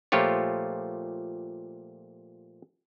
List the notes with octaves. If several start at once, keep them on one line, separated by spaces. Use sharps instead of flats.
A#2 F3 A3 F4 G4 C#5